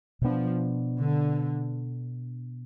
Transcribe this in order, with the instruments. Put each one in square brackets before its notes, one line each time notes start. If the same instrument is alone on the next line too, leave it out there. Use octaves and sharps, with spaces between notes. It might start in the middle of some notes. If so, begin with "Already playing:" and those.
[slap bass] B2 B3 D4 [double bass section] F3
[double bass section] D3